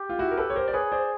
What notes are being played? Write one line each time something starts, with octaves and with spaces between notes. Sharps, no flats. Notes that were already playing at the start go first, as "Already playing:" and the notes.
Already playing: G4
F4
E4 F#4
A#4
A4 B4
C#5
A#4 C5
D5
G#4 B4 C#5
C5 D5